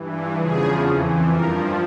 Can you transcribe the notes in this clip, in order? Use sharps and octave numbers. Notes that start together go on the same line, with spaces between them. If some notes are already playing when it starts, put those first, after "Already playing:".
Already playing: G2 E3
E2 C#3 F3 G#4
F2 E3
G2 F3 A#4